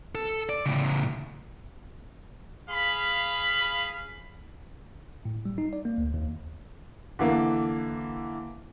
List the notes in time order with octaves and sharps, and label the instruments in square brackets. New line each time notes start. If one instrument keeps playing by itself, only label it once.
[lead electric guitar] A4
D5
A2 C#3
[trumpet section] G#4 F5 B5
[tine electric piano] A2
G3
D#4
D5
A#3
D2
D#2
[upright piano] D3 E3 A#3